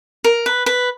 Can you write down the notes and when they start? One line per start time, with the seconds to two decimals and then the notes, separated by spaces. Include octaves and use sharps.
0.24 A#4
0.46 B4
0.66 B4